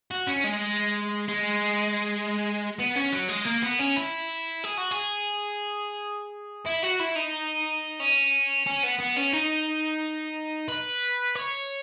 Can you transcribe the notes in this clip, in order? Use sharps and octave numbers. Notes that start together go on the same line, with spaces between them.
F#4
C#4
G#3
G#3
B3
C#4
F#3
G#3
A#3
B3
C#4
E4
G#4
F#4
G#4
E4
F#4
E4
D#4
C#4
C#4
B3
B3
C#4
D#4
B4
C#5